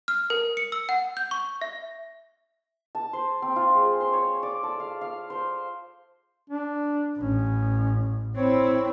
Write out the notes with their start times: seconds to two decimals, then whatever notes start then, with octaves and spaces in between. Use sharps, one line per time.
0.08 F6
0.30 A#4
0.57 C#7
0.72 E6
0.89 F#5
1.17 G6
1.31 C#6
1.61 E5
2.95 A5
3.13 C5
3.42 C4
3.56 F4
3.75 G#3
4.00 C5
4.13 C#5
4.43 D5
4.63 A4
4.80 F5
5.01 F5
5.30 C5
6.50 D4
7.18 A1 C#4
8.36 C4 E4 C#5